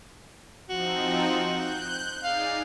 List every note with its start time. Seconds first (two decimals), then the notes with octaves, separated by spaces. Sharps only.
0.70 F3 C4 D#4 F#4
1.48 F#6 G6
2.24 D#4 G#4 D5 F5